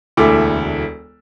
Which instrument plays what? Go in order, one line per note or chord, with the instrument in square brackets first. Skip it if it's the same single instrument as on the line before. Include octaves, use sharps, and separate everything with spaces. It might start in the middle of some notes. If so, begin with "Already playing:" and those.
[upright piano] E1 D2 E4 A4 D6